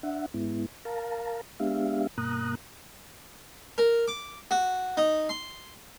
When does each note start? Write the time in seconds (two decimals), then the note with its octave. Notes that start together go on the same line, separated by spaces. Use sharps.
0.03 D4 E5 F#5
0.34 G#2 G#3 B3 E4
0.85 A#4 F5 A5 A#5
1.60 G#3 B3 D4 G4 E5 F5
2.18 G2 B2 A#3 A#5 D#6 F#6
3.78 A#4
4.08 D6
4.51 F#4
4.97 D#4
5.29 C6